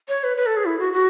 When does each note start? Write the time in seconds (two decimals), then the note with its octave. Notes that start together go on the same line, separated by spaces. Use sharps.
0.09 C#5
0.24 B4
0.37 B4
0.46 A4
0.57 G#4
0.65 E4
0.79 F#4
0.93 F#4